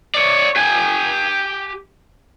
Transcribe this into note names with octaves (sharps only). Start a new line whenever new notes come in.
C#5 D5
G4 G#5